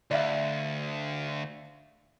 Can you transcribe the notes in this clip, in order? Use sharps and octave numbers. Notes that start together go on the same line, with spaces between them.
D2 D5 E5 F5